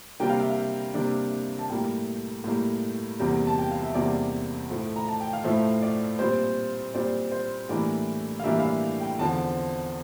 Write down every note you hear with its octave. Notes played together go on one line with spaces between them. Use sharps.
C3 G3 A#3 D4 G5
F5
E5
F5
C3 G3 A#3 D4
A5
A2 G3 A#3 G5
A2 G3 A#3
E2 C3 G3 A#3
A5
G5
F5
E5
E2 C3 G3 A#3 D5
A2 F3 A3
A#5
A5
G5
F5
A2 F3 A3 E5
D5
A#2 G3 C4 C5
A#2 G3 C4 D5
C5
A2 E3 G3 A#3 D4 D5
F5
A2 E3 G3 A#3 D4 E5
F5
E5
G5
E2 D3 F3 C4 A5